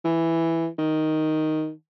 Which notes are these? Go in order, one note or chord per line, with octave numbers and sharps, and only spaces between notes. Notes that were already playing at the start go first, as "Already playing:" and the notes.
E3
D#3